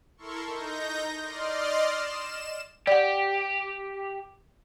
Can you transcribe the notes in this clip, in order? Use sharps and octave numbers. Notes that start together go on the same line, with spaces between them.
E4 A4 A#4 C6 C#6
D#4 G6 A#6
D5 D#5 C6 F6
E7
G4 D5 F#5